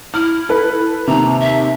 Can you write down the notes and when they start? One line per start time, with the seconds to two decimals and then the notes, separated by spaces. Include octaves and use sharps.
0.14 E4 F6
0.49 A4 B4
1.07 D#2 C3 A#5
1.40 E5